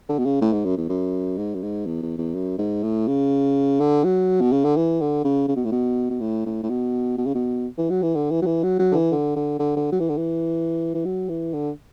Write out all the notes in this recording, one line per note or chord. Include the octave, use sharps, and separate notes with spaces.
D3
B2
C#3
A2
G#2
F#2
E2
F#2
G#2
F#2
G#2
E2
E2
E2
F#2
G#2
A2
C#3
D3
F#3
B2
C#3
D3
E3
D3
C#3
C#3
B2
A2
B2
B2
A2
A2
A2
B2
B2
C#3
B2
E3
F#3
E3
D3
E3
F#3
E3
F#3
F#3
D3
E3
D3
D3
D3
D3
F#3
E3
D3
E3
E3
F#3
E3
D3